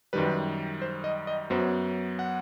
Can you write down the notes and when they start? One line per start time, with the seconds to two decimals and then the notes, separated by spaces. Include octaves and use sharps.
0.13 F#2 D#3 G3 B4
0.82 C5
1.04 D#5
1.27 D#5
1.50 F#2 F#3 B3 C5
2.19 F#5